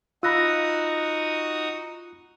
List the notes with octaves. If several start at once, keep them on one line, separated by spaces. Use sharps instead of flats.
D#4 F4 F#4 B5 D#6 E6 F#6 A#6